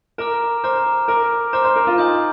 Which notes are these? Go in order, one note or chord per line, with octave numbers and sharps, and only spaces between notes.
A#4 A#5 D6 F6
C5 A#5 D6 F6
A#4 A#5 D6 F6
C5 A#5 D6 F6
C5
A#4
F4
D#4 G#5 C6 D#6 G6